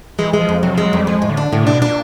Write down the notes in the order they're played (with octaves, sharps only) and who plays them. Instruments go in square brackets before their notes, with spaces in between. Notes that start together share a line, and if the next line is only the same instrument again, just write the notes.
[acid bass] E3 [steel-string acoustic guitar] G#3
[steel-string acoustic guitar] G#3
[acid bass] F3
[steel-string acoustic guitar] F2
[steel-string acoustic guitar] C3 [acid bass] F#3
[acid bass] F3 [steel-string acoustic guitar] G#3
[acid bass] F#3
[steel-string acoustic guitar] F2 [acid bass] G3
[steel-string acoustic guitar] F3 [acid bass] G#3
[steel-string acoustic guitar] A2
[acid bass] D3
[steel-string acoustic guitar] D4
[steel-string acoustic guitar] A2 [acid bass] D3
[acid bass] C3 [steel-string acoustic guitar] D4
[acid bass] B2
[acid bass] A#2 [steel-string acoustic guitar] D4